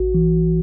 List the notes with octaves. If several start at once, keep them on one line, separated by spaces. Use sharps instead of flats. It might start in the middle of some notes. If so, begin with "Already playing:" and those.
Already playing: A1 F#4
E3